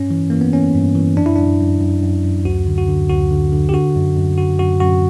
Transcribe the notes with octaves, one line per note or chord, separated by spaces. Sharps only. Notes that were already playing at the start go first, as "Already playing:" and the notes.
Already playing: G2 C#4
E3
E3 A#3
B3
E3 C#4
G2
E3
F#2 D4
E4
F#2 D4
F#2
F#2
F#2
F#2
D2 F#4
D3
F#4
D3
D2 F#4
D3
D3
G4
D3 F#4
F#2
F#2
D3 F#4
F#2 F#4
F#2 F#4